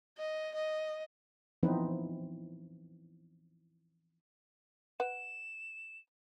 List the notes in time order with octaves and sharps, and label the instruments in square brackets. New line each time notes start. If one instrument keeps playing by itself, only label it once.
[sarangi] D#5
D#5
[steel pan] E3 F3 B3 C4 D#4 B4
[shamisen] B4 F#5 [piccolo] E7